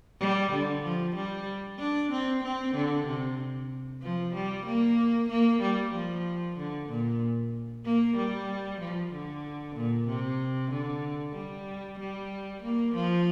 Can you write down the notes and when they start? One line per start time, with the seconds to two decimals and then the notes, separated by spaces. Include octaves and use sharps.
0.20 G3
0.52 D3
0.84 F3
1.16 G3
1.79 D4
2.12 C4
2.43 C4
2.75 D3
3.07 C3
4.02 F3
4.35 G3
4.66 A#3
5.30 A#3
5.62 G3
5.94 F3
6.58 D3
6.89 A#2
7.85 A#3
8.17 G3
8.80 F3
9.12 D3
9.76 A#2
10.08 C3
10.71 D3
11.35 G3
12.00 G3
12.63 A#3
12.95 F3